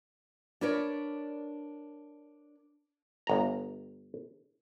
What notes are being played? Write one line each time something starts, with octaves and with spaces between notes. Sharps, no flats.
D4 A#4 B4 C#5 D5
G1 A#5